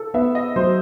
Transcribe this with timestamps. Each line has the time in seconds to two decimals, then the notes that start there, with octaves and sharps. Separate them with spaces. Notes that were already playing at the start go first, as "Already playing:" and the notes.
Already playing: A4
0.14 B3 E5
0.35 D#5
0.56 F#3 C5